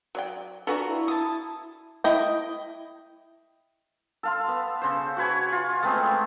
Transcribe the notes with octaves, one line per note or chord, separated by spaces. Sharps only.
F#3 D5 G5
D4 F4 F#4 A4 B4 G#5 A#5
E4
A5 D#6
E4 D#5 G5
A4 F5 C6
B3
C#3 C5
F#4 B4 C#5 G#5
F4
G#3 A3 B3 C4